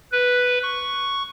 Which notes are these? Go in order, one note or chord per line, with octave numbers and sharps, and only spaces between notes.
B4
C#6